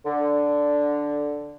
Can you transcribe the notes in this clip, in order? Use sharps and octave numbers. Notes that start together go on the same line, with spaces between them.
D3